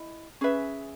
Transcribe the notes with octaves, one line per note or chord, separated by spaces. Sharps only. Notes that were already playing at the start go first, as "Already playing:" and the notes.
Already playing: E4 D#5
C#4 G#4 B4 E5